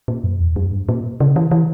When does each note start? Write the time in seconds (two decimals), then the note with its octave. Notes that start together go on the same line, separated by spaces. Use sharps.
0.08 A#2
0.24 F#2
0.40 E2
0.56 F#2
0.71 G2
0.89 A#2
1.20 C#3
1.36 E3
1.51 E3